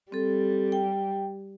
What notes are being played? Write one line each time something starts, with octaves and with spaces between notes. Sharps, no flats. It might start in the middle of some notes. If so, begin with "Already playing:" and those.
G3 C4 A4
G5